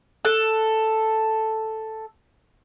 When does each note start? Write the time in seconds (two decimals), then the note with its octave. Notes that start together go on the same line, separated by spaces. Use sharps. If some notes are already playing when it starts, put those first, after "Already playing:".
0.25 A4 F#6